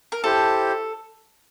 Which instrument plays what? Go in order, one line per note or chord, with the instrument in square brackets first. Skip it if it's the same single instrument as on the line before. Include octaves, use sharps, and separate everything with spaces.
[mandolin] A#4
[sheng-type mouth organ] E4 G4 C5 [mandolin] A4